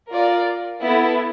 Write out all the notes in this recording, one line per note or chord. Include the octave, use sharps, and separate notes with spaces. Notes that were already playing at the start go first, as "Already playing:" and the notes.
F4 A#4 D5
B3 E4 A4